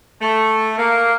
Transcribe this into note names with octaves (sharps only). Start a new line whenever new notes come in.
A3
A#3